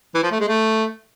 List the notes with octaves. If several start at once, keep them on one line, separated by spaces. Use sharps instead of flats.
E3
F3
A3
G#3
A3